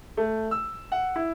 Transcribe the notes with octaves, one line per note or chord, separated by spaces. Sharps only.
A3
E6
F#5
E4